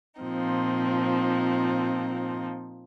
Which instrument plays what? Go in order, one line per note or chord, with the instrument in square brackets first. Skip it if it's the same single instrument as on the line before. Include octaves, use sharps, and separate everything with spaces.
[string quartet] A#2 F3 C4 D#4